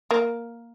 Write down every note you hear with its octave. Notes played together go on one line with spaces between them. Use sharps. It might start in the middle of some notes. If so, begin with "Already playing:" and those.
A#3